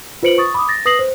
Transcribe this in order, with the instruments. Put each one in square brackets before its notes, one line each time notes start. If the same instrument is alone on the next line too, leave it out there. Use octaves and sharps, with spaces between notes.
[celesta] F4 B4 C5 C#7 D7 F#7
C#6 D#6 A6
B5 D6 D#6
A6 A#6
B4 D#6 A#6 C7 F#7
C5